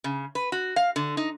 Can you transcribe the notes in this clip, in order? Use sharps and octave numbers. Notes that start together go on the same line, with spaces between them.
C#3
B4
F#4
F5
D3
D#4